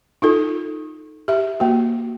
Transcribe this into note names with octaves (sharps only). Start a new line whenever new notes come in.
D#4 F4 A4
G4 E5
A#3 F#4